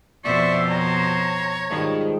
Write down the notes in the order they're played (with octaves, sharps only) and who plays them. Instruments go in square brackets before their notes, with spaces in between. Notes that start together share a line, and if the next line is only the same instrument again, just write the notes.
[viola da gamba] F2 B2 C5 [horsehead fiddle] D5 E5 [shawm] C#6
[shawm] C#5 [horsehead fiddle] A#5
[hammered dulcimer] G#2 F3 G3 [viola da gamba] D#3